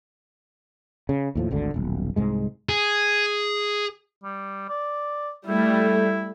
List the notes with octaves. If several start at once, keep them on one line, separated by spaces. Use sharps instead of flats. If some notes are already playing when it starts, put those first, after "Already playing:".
C#3
D#2 A2 F3
G#1 D2 D3
D#1 B1
C2 G#2 G#3
G#4
G3
D5
G3 A3 E4